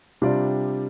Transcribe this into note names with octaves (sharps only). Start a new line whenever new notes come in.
C3 G3 D4 F4 D5